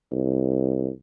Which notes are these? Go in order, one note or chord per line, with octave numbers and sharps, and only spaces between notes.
C2